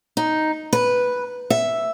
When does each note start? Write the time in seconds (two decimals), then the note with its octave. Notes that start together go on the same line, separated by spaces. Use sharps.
0.17 D#4
0.73 B4
1.50 E5